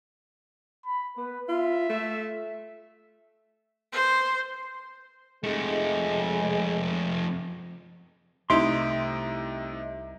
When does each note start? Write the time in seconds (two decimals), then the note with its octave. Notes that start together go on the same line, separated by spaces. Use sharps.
0.86 B5
1.17 B3 B4
1.49 F4 E5
1.90 A3
3.92 C5
5.44 F2 G#3 A3
8.50 C2 C3 A3 D#4 E4 E5 C6 D7